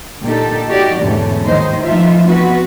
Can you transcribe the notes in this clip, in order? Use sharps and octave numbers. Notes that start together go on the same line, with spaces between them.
A#2 D3 D#4 G4 A4
D#4 F#4 G4 D5
E2 G#2 B2 D3 A3 C#4
D#2 A2 D#3 A#3 C5 D#5
E3 F3 A3 D#4 F4 E5
B3 C4 F#4 B4